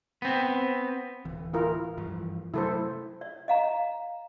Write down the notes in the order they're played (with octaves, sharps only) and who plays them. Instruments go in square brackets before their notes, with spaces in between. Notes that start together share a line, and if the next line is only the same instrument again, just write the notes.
[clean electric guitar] B3 C4
[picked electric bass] D1 E3
[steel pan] E4 F4 A#4
[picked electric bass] G2 E3 F3
[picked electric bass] C3 F#3 A3 [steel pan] E4 A4 C5
[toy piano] D5
D#5 F5 A#5